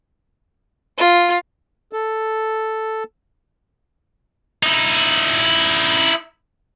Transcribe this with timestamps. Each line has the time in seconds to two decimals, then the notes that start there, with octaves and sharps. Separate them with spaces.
0.98 F4
1.93 A4
4.63 D#4 E4